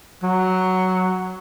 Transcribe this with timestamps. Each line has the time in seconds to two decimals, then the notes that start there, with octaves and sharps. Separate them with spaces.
0.23 F#3